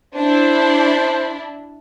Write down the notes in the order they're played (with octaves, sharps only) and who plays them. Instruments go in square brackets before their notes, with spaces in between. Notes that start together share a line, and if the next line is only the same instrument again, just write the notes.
[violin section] D4 E4 [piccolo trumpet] C5